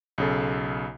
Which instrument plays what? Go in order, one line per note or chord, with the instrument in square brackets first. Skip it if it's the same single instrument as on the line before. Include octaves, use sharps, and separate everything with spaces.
[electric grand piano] B1 C#3 A4